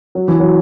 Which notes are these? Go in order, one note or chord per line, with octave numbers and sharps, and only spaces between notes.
F#3
E3
F#3